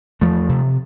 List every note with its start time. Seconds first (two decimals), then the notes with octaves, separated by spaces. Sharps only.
0.21 E2 F3 A3
0.49 C3